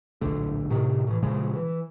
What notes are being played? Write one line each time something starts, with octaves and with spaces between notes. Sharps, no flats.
D1 A#1 D3 A3
A2 C3 D#3
A2 E3
A#2 C#3 F3 G#3
E3